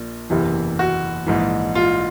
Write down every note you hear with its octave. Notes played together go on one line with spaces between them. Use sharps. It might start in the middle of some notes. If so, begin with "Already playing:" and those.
Already playing: A#1 A#2
F#1 E2 C3 E3
F#4
A#1 G#2 E3
F4